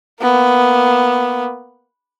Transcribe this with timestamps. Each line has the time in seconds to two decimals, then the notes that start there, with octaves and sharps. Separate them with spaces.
0.22 A#3 B3